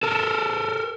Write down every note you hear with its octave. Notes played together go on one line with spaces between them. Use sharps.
A4 A#4